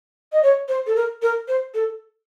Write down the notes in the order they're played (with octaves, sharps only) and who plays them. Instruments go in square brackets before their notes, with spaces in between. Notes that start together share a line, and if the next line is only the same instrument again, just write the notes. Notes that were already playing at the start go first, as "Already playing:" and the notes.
[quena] D#5
C#5
C5
A4
A#4
A#4
C5
A4